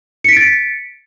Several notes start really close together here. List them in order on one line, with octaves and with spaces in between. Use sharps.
C#7 B6 D7 A6